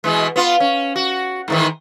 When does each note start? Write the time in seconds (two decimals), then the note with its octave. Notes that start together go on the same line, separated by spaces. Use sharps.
0.04 B2 E3 G#3
0.36 B3 F4
0.60 C#4
0.96 F#4
1.48 G#2 D#3 E3